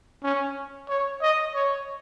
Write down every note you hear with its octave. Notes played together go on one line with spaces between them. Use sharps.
C#4
C#5
D#5
C#5